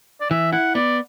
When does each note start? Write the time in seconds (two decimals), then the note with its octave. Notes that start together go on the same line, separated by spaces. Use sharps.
0.21 D5
0.30 E3 E5
0.52 E4 F#5
0.75 B3 D5